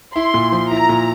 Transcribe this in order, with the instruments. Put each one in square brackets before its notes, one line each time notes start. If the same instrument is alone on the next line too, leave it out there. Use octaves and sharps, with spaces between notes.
[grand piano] E4 [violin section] C6
[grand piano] A#2
F3
[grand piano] E4 [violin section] A#5
[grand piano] A#2